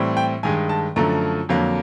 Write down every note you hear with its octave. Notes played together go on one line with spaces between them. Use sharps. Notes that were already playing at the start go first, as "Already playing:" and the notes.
Already playing: A2 E3 G3 C4
G5
G2 D#3 G#3 G#5
A5
F#2 D3 F3 A3 A#5
F2 D3 F#3 A#3